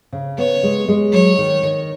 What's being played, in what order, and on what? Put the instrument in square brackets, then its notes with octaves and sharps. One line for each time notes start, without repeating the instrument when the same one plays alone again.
[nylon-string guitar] C#3
[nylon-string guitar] B3 [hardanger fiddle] C#5
[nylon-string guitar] G#3
G#3
[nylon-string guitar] F#3 [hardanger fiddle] C#5
[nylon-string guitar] D#3
D#3